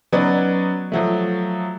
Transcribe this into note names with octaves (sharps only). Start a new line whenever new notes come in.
F#3 B3 C#4 D#4 B4 D5
F3 F#3 A3